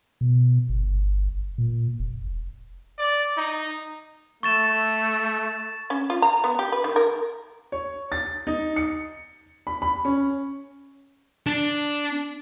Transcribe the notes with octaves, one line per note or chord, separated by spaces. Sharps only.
B2
G1
A#2
F1
D5
D#4
A3 C#6 A6 E7
C#4
F4
A#5
B3
G4
B4
D#3
A#4
C#5
A6
D#4
C#7
B5
B5
C#4
D4